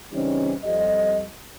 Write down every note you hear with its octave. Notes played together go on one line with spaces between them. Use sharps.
C#3 E3 G3 C4 C#4 D#4
F2 G3 D#5